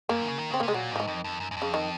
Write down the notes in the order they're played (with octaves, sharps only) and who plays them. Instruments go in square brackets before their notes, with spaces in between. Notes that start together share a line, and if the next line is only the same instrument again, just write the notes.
[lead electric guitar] F#2 [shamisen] A#3
[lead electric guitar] D#3
C#3
D#3
[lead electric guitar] C#3 [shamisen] C4
[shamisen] A#3
[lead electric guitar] C3
[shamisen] G#3
[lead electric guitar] A#2 [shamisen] F#3
[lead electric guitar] G#2 [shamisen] F3
[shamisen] D#3
[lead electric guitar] F2
F2
F#2
F#2
F2
[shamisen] C#3
D#3